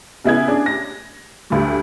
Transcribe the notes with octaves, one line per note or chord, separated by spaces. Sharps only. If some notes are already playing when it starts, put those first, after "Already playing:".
C#3 B3 E4 G#4 G#6
C#4 D4 G#4
A#6
D2 G3